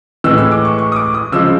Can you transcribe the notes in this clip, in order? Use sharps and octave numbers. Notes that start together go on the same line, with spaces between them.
A2 E3 G#3 E6
E6
D6
C#6
C#6
D#6
D6
D#6
C#3 F3 G#3 E6